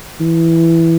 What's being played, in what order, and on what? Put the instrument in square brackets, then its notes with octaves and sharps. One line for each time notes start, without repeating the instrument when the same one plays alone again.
[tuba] E3